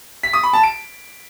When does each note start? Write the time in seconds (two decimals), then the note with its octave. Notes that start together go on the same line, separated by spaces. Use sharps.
0.23 B6
0.33 D#6
0.43 B5
0.53 A5
0.63 D7